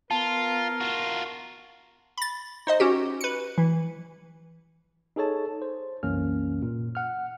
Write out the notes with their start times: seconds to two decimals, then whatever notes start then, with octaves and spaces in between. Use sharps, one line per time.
0.11 B3 F4 A#4 A5
0.81 F4 F#4
2.18 B5 A6
2.67 D#4 C5 D#5
2.80 C#4 F#4 G4
3.21 B4 C#7
3.58 E3
5.16 D#4 G#4 A4 C#5 A5
5.62 C5
6.03 C2 F#2 E3 A#3 C#4 F6
6.62 A#2
6.95 F#5 F6